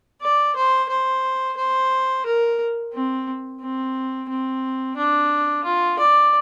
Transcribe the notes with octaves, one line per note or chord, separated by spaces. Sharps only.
D5
C5
C5
C5
A#4
C4
C4
C4
D4
F4
D5